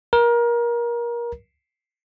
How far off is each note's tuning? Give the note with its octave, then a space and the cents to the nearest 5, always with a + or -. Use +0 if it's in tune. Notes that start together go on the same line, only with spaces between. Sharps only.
A#4 +25